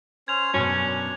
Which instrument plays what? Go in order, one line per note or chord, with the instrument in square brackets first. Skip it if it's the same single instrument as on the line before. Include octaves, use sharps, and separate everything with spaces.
[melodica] C#4 C5 [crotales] G#6 F7
[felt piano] F#2 B2 [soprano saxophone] C#4 [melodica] D4